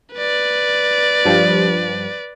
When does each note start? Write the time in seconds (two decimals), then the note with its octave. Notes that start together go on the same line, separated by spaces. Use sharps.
0.14 B4 D5
1.25 G2 F3 G3